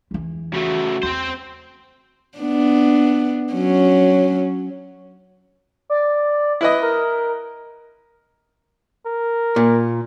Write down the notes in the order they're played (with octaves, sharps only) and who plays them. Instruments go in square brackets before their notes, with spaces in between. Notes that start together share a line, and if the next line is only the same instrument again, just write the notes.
[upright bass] E2 E3
[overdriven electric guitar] C#3 A3 [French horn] F#4
[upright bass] E2 [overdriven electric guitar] C4 C5
[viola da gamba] B3 D4
F#3 C#4
[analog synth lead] D5
[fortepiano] E4 B4 D#5
[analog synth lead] A#4
[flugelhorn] A#4
[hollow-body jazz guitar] A#2